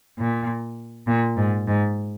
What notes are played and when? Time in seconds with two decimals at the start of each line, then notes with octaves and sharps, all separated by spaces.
0.19 A#2
1.07 A#2
1.37 G#2
1.67 G#2